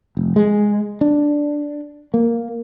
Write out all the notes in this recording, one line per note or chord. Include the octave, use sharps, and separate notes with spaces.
F1
G#3
D4
A#3